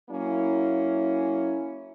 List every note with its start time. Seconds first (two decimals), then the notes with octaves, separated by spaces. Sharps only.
0.10 F#3 A#3 C#4 E4